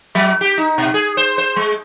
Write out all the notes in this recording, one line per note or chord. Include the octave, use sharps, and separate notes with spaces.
F#3
G4
D#4
B2
G#4
C5
C5
G#3